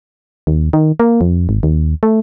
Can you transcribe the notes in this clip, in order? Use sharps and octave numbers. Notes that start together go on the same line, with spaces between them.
D#2
D#3
A#3
F2
G#1
D#2
A3